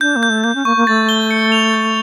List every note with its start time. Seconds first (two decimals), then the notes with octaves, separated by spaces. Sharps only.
0.01 D4 G6
0.16 A#3
0.23 G6
0.30 A3
0.44 A#3 G6
0.55 C#4
0.65 A#3 C#6
0.76 A#3
0.87 A3 A6
1.09 G7
1.31 C#7
1.52 F7
1.73 G6